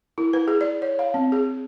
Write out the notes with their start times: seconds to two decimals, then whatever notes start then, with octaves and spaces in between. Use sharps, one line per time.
0.18 E4
0.33 B4
0.48 G#4
0.61 D5
0.82 C#5
0.99 F5
1.14 C4
1.32 G#4